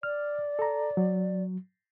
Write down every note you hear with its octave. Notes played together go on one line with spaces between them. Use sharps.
D5 F6
A4 A#5
F#3